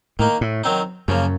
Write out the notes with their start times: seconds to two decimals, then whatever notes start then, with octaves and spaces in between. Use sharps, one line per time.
0.19 A2 D#3 A#3 D#4
0.41 A2
0.64 D#3 F#3 C4 D#4
1.08 F#2 C#3 F3 A#3